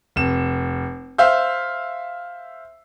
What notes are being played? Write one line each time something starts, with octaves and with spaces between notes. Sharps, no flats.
F1 E7
C5 E5 F5 E6 G6